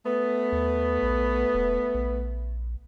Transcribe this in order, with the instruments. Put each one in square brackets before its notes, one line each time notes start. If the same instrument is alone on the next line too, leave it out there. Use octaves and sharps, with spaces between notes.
[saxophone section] A3 B3
[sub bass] D#2
A#1
E1
A#1